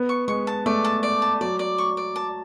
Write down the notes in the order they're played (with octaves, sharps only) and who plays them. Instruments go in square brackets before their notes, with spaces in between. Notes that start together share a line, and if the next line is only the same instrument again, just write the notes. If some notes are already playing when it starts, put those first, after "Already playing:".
Already playing: [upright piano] B3
[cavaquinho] C#6
[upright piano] G#3 [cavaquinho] C#6
[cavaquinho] A5
[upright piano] A3 [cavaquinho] D5
[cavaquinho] A5
D5
A5
[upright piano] F#3 [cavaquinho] D5
[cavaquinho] D5
C#6
D5
A5